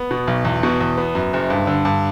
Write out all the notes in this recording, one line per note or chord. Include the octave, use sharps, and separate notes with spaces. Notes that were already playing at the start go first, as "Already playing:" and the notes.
Already playing: B3
B2
B1
E2
B2
E2
B3
F#2
F#1
G2
D3
G2